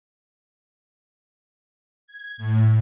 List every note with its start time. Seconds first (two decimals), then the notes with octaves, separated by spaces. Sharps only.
2.07 G#6
2.37 A2